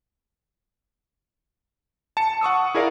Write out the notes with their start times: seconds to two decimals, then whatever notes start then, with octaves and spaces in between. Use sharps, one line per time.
2.17 A5 C#7
2.41 F#5 C#6 D#6 E6
2.75 E4 G#4 A#4 D5 F5